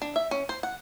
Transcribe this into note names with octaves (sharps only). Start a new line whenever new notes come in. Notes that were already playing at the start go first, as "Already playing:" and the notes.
D4
E5
C#4
C5
F#5